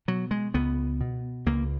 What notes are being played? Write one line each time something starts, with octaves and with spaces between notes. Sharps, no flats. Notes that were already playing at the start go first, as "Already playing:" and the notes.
B2 F#3
G#3
C#2 B3
B2
C#2 A#3